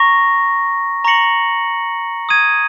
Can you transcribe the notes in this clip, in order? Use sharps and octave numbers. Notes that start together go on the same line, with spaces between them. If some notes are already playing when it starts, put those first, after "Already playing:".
Already playing: A#5 C#6 A#6
A#5 C#6 A#6 C#7 F#7
D#6 G#6 D#7